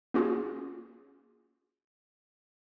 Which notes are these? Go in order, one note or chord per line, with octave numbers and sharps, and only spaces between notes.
A#3 C#4 F4 F#4 G#4